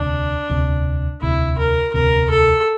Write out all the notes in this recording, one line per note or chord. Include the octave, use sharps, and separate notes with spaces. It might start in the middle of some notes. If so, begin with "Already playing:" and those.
Already playing: E1 D2 C3 D4
E1 D2 C3
E1 D2 C3 E4
A#4
E1 D2 C3 A#4
A4